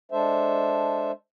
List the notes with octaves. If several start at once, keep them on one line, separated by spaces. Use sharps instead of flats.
G#3 D4 A4 C5 E5